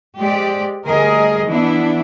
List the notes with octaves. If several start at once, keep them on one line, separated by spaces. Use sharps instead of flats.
G#3 G4 C5 D5
D2 G3 G#4 A#4 D#5
E3 B3 D4 E4